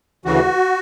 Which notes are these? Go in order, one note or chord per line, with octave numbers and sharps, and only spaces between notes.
D2 C#3 E3 F#4